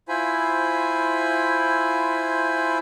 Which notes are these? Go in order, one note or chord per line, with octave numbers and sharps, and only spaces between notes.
E4 F4 C5 G#5 B5